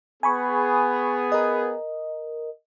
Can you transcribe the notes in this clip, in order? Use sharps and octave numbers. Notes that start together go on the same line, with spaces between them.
B3 G#4 G#5 B5 C#6
A#4 D#5